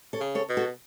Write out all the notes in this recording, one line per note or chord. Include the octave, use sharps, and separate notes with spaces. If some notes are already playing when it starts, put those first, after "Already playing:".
A4 C#5
C#3
A4 C#5
B2
F#4 A4